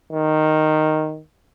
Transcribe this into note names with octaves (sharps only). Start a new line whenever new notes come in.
D#3